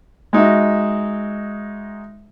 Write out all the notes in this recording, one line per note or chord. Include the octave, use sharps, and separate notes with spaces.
G#3 D#4 F#4 E5